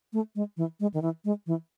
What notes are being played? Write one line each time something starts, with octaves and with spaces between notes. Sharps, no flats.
A3
G#3
E3
G#3
D#3
E3
G#3
E3